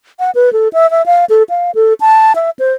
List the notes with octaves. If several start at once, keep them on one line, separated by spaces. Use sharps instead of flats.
F#5
B4
A4
E5
E5
F5
A4
F5
A4
A5
E5
C5